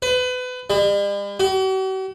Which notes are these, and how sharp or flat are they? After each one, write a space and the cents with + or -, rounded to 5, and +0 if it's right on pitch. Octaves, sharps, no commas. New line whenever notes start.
B4 +30
G3 +45
F#4 +45